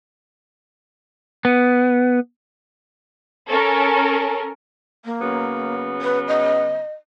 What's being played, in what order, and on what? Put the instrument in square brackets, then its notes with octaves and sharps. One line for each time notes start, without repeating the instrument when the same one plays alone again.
[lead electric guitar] B3
[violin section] C#4 A4 A#4
[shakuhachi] A#3
[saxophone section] C#3 F#3 B3
[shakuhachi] B4
D#5